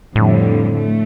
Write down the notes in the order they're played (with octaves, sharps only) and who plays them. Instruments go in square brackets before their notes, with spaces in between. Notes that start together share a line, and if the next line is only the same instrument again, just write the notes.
[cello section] F2 D3 G3 [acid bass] A2
[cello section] A3